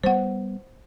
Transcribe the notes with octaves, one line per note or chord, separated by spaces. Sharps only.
G3 B3 C5 F#5